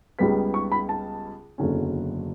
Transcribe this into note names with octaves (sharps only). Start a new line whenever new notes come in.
C#2 C#3 G3 B3 B6
C#6
B5
A5
F#1 E2 D3 F#3 C#4